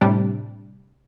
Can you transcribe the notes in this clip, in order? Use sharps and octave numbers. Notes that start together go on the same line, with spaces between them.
A2 C3 G3 D4